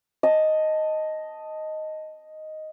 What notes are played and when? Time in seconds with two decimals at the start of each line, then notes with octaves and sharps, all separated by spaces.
0.23 D#5 A5